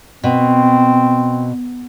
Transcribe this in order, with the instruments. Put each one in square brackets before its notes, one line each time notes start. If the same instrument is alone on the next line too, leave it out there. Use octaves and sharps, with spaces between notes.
[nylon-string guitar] B2 [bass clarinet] C4